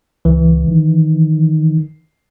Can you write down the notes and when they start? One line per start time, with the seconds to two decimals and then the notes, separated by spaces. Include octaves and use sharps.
0.25 C#2 E3
0.68 D#3